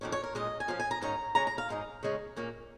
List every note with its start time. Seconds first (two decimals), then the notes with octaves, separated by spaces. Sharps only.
0.01 F2 D#3 A#3 C#4
0.12 C#5
0.24 A#4
0.35 A#2 G#3 C#4 D#5
0.60 G#5
0.68 A#2 F3 C#4 F5
0.80 G#5
0.91 A#5
1.01 G#2 D#3 C#4 A#5
1.35 C#3 G#3 C#4 A#5
1.47 A#5
1.58 F5
1.69 G#2 G#3 D#4
2.03 C#3 G#3 C#4
2.36 A#2 A#3 C#4